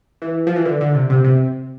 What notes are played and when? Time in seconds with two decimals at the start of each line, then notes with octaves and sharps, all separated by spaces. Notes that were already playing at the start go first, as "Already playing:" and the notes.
0.22 E3
0.47 F3
0.56 E3
0.65 D3
0.81 D3
0.95 C3
1.10 C3
1.24 C3